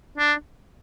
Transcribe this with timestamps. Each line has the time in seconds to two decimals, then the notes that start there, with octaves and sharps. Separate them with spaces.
0.18 D4